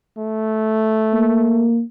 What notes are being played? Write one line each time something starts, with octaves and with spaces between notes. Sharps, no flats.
A3
A#3